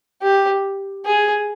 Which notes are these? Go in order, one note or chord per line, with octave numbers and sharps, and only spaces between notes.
G4
G#4